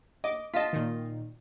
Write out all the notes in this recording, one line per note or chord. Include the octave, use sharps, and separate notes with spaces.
D#5 D6
F4 D#5 A5 B6
A#2 D#3